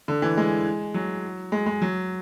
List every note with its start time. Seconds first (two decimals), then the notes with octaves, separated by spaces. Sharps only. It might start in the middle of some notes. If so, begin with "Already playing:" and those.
0.08 D3
0.22 E3
0.37 G#3
0.94 F#3
1.52 G#3
1.66 G#3
1.82 F#3